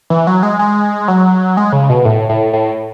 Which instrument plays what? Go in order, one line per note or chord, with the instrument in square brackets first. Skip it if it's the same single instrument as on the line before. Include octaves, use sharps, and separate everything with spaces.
[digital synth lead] E3
F#3
G#3
G#3
F#3
G#3
C#3
B2
A2
A2
A2